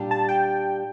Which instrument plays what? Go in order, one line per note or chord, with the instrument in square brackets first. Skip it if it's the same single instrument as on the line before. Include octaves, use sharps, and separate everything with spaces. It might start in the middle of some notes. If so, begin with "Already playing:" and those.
Already playing: [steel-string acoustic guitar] A#2 G3 D4 G4
[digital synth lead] A5
G5